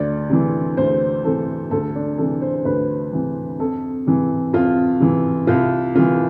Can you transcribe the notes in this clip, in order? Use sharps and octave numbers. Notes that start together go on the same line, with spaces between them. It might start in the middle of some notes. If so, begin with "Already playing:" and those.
Already playing: D2 D5
C3 E3
D2 C5
C3 E3 A4
D2 A4
D4
C3 E3 A4
C5
D2 B4
C3 E3
F2 A4
C3 E3
F2 F4
C3 E3
C2 F4
C3 E3 F4